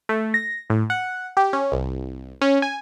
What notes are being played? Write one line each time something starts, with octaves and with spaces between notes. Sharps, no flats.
A3
A#6
A2
F#5
G4
C#4
C2
C#4
G#5